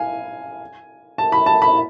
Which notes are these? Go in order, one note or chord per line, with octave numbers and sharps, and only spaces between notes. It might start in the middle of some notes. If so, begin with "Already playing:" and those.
Already playing: F5 G#5
A5
B5
A5
B5